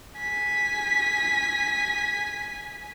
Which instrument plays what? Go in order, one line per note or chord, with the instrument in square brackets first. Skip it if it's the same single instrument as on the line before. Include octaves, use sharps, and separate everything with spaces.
[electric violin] G#5 B6